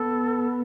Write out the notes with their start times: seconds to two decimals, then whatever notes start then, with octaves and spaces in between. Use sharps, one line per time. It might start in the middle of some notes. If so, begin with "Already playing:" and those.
Already playing: B3 A4